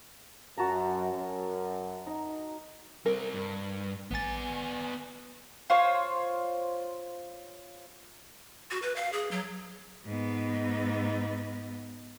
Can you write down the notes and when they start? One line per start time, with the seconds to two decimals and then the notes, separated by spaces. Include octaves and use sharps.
0.57 F#2 F#4 A5 A#5
1.11 F#2
2.07 D#4
3.06 G3 C4 A#4
3.33 G2
4.11 A1 B3 G#5 A6
5.70 F4 C5 C#5
8.71 F#4
8.82 B4
8.96 F5
9.13 G#4
9.31 F#3
10.05 G#2 B3